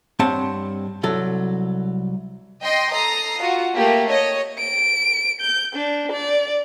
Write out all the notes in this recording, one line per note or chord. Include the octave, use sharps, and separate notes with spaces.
G2 C4 C#5 F#5 A5
C2 F#3 A4
D#5 G5 C6
A4 A#5 D#6 C7
F4 F#4
A3 A#3 G4
C#5 D#5
D7
G6
D4
D5